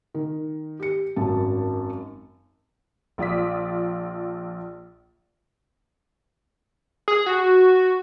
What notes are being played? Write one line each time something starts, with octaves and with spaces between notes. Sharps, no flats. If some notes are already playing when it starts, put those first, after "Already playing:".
D#3
G4 C#7
G#1 F#2 A5
A#1 F4 D5 D#6 B6
G#4
F#4